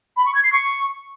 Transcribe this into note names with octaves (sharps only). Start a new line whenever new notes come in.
B5
C#6
G#6
C7
C#6